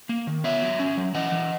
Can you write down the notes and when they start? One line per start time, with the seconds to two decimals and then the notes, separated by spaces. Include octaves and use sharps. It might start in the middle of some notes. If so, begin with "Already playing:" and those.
0.09 A#3
0.27 D#3
0.44 B3 C#5 E5
0.62 F#3
0.79 C#4
0.97 F#3
1.14 E3 D#5 F#5
1.32 E3